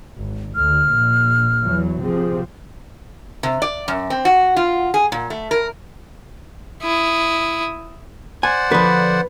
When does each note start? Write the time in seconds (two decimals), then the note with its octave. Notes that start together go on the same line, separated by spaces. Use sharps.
0.18 G#1
0.56 D2 F6
0.94 A#1
1.65 E2 E3 F#3
2.03 C3 F3 C4 G#4
3.43 C3
3.62 D5
3.88 F#2
4.10 C4
4.25 F#4
4.56 F4
4.94 G#4
5.12 A#2
5.30 A3
5.51 A#4
6.83 E4 D#6
8.43 C5 D5 F#5 G#5
8.71 D3 F3 B4